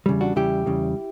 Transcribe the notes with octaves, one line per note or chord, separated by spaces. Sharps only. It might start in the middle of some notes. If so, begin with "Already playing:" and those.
E2 C#3 G3
D4 F#4
E2 C#3 G3 E4 G4
E2 C#3 G3